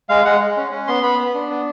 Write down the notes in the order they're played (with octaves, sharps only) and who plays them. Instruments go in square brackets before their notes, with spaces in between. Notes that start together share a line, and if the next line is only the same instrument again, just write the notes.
[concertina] G#3 F5
G#3 F#5
G#3
C#4
C#4
B3 C6
B3 B5
B3
D4
B3